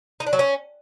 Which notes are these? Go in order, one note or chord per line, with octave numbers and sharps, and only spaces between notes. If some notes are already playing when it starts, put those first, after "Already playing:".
D#4
D4
F#3
C#4